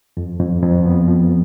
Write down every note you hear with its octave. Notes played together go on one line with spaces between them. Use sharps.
F2
F2
F2
B3
F3